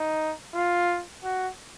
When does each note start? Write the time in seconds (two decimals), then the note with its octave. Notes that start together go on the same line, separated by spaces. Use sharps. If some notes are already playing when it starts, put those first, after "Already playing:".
Already playing: D#4
0.54 F4
1.23 F#4